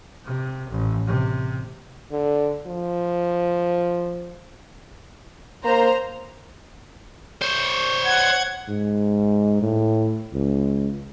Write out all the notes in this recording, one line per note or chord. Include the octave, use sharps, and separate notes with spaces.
C3
A1
C3
D3
F3
A#3 C5 A#5
C5 C#5
F#5 G#6
G#2
A2
C#2